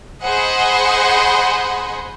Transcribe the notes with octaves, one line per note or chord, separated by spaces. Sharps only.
G#4 C5 D#5 F#5 B5